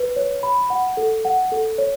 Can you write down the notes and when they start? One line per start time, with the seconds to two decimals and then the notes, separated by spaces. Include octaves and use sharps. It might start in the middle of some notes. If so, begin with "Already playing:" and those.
Already playing: B4
0.16 C#5
0.43 B5
0.70 F#5
0.97 A4
1.25 F#5
1.52 A4
1.78 C#5